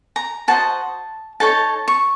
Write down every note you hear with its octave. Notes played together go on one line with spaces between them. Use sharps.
A#5
F#4 C5 D#5 A5
D#4 A4 C#5 A5
C#6